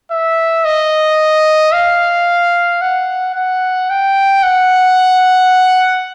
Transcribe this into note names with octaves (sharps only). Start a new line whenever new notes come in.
E5
D#5
F5
F#5
F#5
G5
F#5